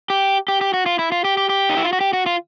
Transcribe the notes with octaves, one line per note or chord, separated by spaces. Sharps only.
G4
G4
G4
F#4
F4
E4
F4
G4
G4
G4
D#4
E4
F4
F#4
G4
F#4
F4